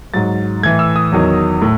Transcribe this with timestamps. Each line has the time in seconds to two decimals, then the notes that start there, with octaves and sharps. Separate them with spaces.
0.14 G#2 F#3 A6
0.63 A2 E3 G#6
0.79 E6
0.96 D#6
1.12 E2 D#3 F#3
1.62 A2